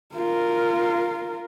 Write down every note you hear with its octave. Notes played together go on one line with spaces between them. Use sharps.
F4 A#4